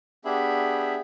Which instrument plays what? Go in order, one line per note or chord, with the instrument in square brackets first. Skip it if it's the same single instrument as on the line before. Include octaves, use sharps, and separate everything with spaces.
[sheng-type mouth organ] B3 D4 G4 G#4 E5 B5